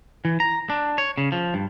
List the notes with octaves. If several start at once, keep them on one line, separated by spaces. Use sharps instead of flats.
E3
A#5
D4
C#5
C#3
F3
G2